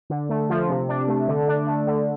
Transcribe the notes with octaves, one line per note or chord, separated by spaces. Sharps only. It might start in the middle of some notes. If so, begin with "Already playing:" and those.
D3
A3
F3
C3
D4
A3
D3
D4
A3
D3